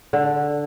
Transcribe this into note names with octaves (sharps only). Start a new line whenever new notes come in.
D3